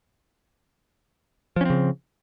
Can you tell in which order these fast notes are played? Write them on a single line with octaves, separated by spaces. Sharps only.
F3 C#4 C4 C#3